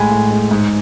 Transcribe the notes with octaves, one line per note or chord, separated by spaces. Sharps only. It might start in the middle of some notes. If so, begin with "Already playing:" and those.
Already playing: A2 G#3 G#5 B5
A2
G#3
G#2